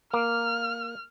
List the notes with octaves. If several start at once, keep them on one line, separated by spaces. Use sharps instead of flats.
A#3 F6